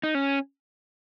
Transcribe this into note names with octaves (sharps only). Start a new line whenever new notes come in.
D#4
C#4